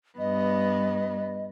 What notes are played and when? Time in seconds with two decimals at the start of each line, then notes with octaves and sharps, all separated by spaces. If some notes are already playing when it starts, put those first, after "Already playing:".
0.19 G2 B3 D#5